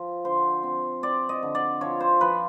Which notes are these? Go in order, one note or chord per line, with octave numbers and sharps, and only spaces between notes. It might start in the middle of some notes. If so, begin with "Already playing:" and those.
Already playing: F3
D3 C5
C4
C4 D5
D#5
D3
D5
F3 C#5
C5
F3 B4